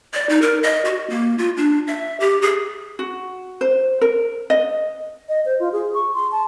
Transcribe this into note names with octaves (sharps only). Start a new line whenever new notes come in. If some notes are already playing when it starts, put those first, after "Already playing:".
D5
D#4
A#4
D#5
F#4
A#3
F4
D4
E5
G4
G#4
F#4
C5
A#4
D#5
D#5
C5
F4
G#4
C#6
C6
A5